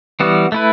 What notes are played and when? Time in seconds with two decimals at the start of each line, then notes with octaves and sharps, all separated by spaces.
0.20 E3 G3 B3 F#4
0.52 A3 E4 B4